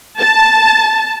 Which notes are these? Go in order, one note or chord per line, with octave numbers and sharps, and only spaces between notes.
A5